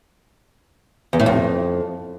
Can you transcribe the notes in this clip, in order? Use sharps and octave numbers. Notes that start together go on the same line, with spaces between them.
E2
A2
F2